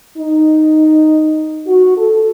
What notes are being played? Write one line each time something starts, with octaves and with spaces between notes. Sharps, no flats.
D#4
F#4
A4